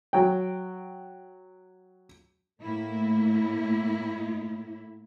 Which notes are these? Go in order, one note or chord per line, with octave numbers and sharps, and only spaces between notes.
F#3 G5
A2 A3 A#3 E4